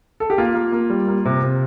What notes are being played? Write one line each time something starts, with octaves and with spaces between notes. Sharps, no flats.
A4
G4
A#3 F4
A#3
A#3
G3
A#3
C3
C3